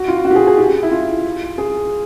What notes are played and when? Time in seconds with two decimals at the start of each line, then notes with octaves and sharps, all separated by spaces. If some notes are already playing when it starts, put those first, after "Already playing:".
Already playing: F#4
0.08 F4
0.25 F#4
0.31 G4
0.36 G#4
0.47 G#4
0.57 G4
0.83 E4
0.91 F4
1.58 G#4